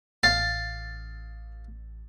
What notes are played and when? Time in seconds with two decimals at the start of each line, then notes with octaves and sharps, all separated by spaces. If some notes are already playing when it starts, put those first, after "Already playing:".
0.23 A1 F5 A6